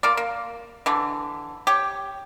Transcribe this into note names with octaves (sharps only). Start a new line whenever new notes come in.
A#3 F4 D5
A#3
D3 E3
G4 C#5